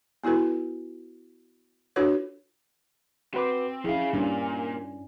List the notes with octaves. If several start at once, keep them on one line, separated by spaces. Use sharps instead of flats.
B3 E4 F#4 A4 B4
D4 F4 F#4 A4 B4 C#5
C4 F#4 B4 D6
F3 C#4 E4 G#4 F5
G2 A#2 C#4 D4